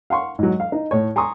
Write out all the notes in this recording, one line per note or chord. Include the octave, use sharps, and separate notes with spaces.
F5 F#5 C6 C#6
G#2 F#3
F5
D#4
A2 C#5
G#5 A#5 C6 C#6 D#6